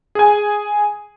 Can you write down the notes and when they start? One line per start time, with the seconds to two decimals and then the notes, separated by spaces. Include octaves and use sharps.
0.15 G#4 G#5